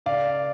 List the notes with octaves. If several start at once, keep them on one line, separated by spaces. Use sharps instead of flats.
C#2 D5 F5